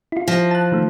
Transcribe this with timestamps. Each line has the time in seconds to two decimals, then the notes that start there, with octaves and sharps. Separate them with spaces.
0.12 E4 F4
0.28 F3 A#6
0.51 A5 F#6
0.72 D#3 A3